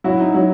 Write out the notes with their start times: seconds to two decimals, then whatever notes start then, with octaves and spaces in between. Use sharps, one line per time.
0.04 F#3 E4 F#4
0.20 D#4
0.34 F#3